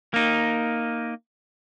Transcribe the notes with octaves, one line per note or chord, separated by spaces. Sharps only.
A#3 D#4